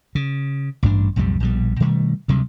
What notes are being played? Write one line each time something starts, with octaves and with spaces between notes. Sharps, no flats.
C#3
A1 G2 D4
B1 F2 A2 G3
A#1 B2 G3
B2 D#3 G3 A3
D2 C3 F#3 G3